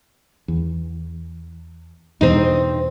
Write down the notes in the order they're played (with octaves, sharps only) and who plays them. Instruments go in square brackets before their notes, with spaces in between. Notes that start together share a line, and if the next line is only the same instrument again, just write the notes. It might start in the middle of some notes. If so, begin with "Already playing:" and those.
[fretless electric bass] E2
[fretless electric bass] E2 B2 [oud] C4 D#4